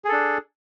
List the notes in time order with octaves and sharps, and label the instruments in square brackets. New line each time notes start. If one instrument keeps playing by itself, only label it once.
[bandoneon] G#4
A4
D4